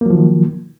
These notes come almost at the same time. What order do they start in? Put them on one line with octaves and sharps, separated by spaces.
A#3 F#3 F3 D#3